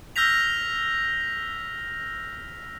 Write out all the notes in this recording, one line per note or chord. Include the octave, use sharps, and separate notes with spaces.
E6 F6 G6 A#6 B6 F7